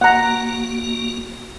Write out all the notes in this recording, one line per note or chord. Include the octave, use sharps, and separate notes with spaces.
A#3 F#4 F#5 A#5